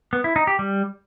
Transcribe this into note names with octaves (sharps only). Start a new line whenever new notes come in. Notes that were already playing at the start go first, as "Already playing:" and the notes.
B3
E4
D#4
G4
G3